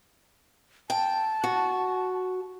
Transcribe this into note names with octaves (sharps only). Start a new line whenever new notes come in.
G5 A5
F#4